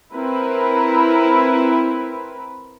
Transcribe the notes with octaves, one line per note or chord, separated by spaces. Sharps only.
C4 E4 A#4 B4